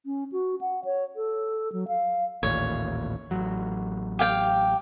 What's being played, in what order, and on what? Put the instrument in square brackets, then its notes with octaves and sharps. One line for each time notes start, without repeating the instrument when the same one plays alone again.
[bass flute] C#4
F#4
F#5
C#5
A4
F#3
F5
[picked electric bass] A1 D#2 A#2 [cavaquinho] C#5
[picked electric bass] A1 F#3
[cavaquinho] G4 F5 G5